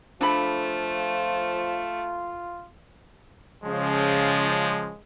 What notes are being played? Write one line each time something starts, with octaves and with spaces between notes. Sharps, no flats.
F3 A3 D4 F4 A4 B5
C#3 F3 G#3